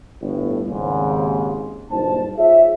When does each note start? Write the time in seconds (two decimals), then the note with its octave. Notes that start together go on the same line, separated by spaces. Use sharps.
0.22 G1 A2
0.67 G#1 D#2 G#2 C#3
1.91 F#1 G2 A#2 D#4 C5 A5
2.38 F4 G#4 C5 C#5 E5